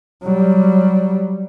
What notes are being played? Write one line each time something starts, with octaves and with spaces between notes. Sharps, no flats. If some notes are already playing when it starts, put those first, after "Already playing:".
F#3 G3